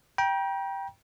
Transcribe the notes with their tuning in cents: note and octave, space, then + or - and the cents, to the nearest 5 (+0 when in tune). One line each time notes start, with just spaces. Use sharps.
G5 +0 A#5 +40